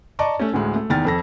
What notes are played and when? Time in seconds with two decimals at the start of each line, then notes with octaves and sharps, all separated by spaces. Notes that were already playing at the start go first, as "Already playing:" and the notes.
0.19 D5 D#5 A5 A#5 C#6 D6
0.39 A3 C#4
0.53 D2 A2 G#3
0.76 A3
0.90 E2 D#3 G#5 F6 A6
1.05 F2 A4 A#6